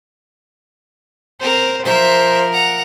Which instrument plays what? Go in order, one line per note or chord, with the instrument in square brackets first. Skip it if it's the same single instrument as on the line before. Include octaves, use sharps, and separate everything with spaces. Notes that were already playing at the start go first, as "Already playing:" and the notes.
[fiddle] C4 A#4 [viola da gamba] C5
[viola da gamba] F3 A#4 [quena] C5 [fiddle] E5 C6
[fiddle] F#5 A#5